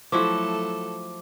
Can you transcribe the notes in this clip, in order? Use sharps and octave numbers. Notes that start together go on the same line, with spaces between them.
F3 F#3 A3 E4 F#4 A4 D6